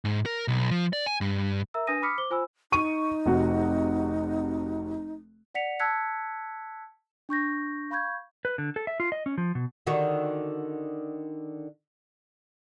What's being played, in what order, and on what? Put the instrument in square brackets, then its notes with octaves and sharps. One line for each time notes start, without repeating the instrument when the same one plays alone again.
[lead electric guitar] G#2
A#4
B1
F3
D5
G#5
G2
[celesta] A#4 E5 A#5 E6
D4 B4 G#5 D#6 A#6 D#7
B5 D6 D#6 F6 B6 C#7
C5 D6 G7
F4 C5 G#5 B5 E6
[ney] D#4 [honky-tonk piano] C#6 D#7
[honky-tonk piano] F1 C3 F#4
[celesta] D5 F#5 B6 C#7 F7
A5 E6 F#6 G#6 B6 C#7
D4 C#6 G6 A#6
F5 B5 C#6 G6 G#6
[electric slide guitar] B4
D3
A4
E5
F4
D#5
C#4
F3
B2
[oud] D3 D#3 F#4